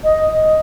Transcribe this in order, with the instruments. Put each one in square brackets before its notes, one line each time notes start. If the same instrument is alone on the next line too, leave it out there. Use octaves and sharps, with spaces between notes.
[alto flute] D#5